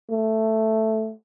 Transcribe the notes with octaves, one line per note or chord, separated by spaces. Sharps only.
A3